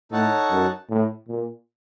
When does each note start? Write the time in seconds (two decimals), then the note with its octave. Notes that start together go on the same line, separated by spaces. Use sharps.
0.12 A2 D#4 A4 C#5 F#5 A5
0.51 F#2
0.90 A2
1.29 A#2